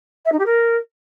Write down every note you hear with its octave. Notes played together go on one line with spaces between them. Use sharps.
E5
D#4
G4
A#4